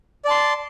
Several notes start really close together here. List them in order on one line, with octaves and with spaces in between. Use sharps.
D5 A5 C6